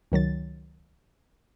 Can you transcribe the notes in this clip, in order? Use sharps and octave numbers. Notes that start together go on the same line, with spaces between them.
C#2 D#3 F#3 A6